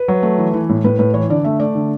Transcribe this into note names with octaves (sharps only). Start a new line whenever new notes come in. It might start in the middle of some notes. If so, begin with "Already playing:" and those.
Already playing: B4
F#3
A3
E3
E3
A2
A2 B4
A2 B4
E3 C#5
D3 D5
A3 E5
A3 D5
D3